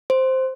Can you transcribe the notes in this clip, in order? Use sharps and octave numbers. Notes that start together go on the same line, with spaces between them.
C5